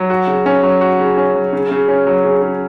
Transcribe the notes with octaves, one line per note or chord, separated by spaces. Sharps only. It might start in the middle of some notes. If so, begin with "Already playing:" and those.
Already playing: F#3
F#4
C#3
C#4
F#3
F#4
C#3
C#4
F#3
C#3
C#3
C#4
F#3
C#3
C#3